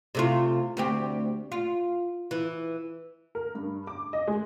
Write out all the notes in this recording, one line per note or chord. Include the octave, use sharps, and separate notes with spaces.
C3 A3 F4
D2 C4 G4
F4
E3
A#4
G2
D6
D#5
G#3